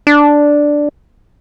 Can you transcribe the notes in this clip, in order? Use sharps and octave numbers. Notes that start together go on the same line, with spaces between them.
D4